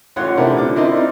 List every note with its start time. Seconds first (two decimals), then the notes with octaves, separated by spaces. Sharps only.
0.16 A1 F4 C#5 F#5 C6
0.37 C3 A3 D4 E4 A#4 C5
0.56 D3 F3 D6
0.76 C4 E4 A#4 D5 D#5 C6
0.96 D#4